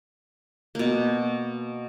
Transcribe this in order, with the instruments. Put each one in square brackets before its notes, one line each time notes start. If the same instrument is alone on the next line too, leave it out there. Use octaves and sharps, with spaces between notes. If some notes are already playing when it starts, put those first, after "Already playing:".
[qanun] B2 A#3